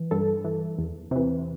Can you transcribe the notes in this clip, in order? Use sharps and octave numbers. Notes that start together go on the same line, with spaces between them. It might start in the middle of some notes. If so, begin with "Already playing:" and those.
Already playing: E3
G2 A4
E3
E2
C3 E3